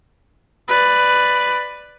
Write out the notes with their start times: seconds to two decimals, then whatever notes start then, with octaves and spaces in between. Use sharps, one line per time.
0.68 B4 D5